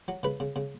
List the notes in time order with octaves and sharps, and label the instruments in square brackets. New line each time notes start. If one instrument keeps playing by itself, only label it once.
[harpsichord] F#3
C#3 B4
C#3
C#3